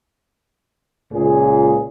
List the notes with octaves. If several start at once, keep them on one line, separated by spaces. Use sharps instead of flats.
C#2 A#2 G#4